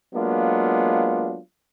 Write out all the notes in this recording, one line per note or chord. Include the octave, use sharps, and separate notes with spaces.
F#3 G#3 A#3 B3 D4 F4